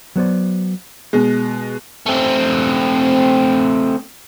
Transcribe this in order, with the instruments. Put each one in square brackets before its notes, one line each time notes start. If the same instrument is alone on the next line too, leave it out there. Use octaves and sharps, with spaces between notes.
[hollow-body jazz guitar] F#3 B3 C5 D5
[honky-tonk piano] B2 G#3
[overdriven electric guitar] A3 C4